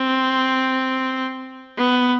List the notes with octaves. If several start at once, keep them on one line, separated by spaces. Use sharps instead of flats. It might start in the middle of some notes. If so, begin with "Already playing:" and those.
Already playing: C4
B3